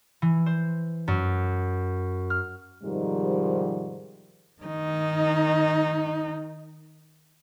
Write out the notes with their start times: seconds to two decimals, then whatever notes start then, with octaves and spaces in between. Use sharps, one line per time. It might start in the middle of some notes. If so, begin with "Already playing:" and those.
0.22 E3
0.46 C5
1.08 F#2
2.30 F6
2.83 G#2 C3 D#3 F3 G3
4.63 D#3 D#4